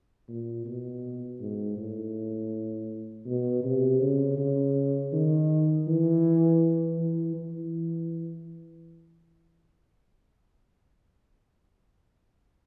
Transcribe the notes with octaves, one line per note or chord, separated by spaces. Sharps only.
A#2
B2
G#2
A2
B2
C3
C#3
C#3
D#3
E3
E3
E3